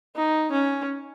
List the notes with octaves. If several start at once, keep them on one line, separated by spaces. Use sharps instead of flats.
D#4
C#4